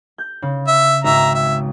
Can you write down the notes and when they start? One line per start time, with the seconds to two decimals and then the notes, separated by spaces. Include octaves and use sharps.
0.18 G6
0.42 C#3
0.68 E5
1.04 G#1 C#2 E5 A#5
1.34 E5